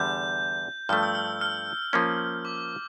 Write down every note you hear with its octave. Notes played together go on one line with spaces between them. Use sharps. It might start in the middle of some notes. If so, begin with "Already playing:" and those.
Already playing: E2 D3 G3 G6
G2 F3 A3 F6
E6
F6
F6
F3 A#3 C#4
D6